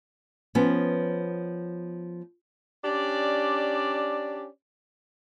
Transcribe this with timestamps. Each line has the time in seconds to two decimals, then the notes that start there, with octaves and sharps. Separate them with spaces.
0.55 F3 B3 C#4
2.85 C#4 D4 G4 D5